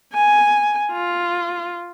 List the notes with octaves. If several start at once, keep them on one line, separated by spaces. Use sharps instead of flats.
G#5
F4